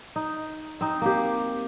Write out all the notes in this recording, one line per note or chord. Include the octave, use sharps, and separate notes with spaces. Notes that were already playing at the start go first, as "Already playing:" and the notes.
D#4
C4 D#4
A#3 G4